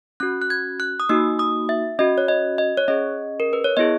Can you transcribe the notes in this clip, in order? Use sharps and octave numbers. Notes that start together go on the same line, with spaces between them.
C#4 F#4 F#6
F#6
G#6
F#6
D#6
A#3 D#4 F#4 E6
D#6
E5
C#4 F#4 D#5
C#5
D#5
D#5
C#5
C#4 G#4 D#5
A#4
B4
C#5
B3 E4 G#4 D#5